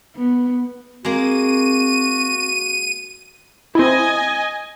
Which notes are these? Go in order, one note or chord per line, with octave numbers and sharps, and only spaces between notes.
B3
G#3 A#3 C4 F#4 D#7
C4 E4 D#5 G#5